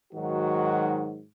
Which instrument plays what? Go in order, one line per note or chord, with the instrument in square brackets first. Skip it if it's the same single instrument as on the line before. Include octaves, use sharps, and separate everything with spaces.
[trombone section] G#2 D#3 F#3 F#4